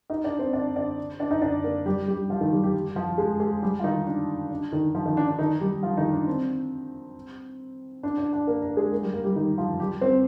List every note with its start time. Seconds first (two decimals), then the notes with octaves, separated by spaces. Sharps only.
0.10 D#4 D#5
0.24 D4 D5
0.39 C4 C5
0.53 D4 D5
0.76 D4 D5
1.20 D4 D5
1.31 D#4 D#5
1.42 D4 D5
1.64 A#3 A#4
1.86 G3 G4
2.08 G3 G4
2.30 F3 F4
2.41 D#3 D#4
2.52 G3 G4
2.63 G3 G4
2.96 F3 F4
3.18 G#3 G#4
3.40 G#3 G#4
3.62 G3 G4
3.79 F4
3.84 D#3 D#4
4.07 D4
4.50 D4
4.72 D#3 D#4
4.95 F3 F4
5.05 D#3 D#4
5.17 D4
5.28 D4
5.39 D#3 D#4
5.61 G3 G4
5.83 F3 F4
5.97 D#3 D#4
6.12 D4
6.27 C4
8.03 D4
8.18 D4
8.33 D4
8.47 A#3 A#4
8.62 A#3 A#4
8.77 G#3 G#4
8.91 A#3 A#4
9.02 G3 G4
9.14 A#3 A#4
9.24 G3 G4
9.36 D#3 D#4
9.58 F3 F4
9.80 G3 G4
10.01 C4 C5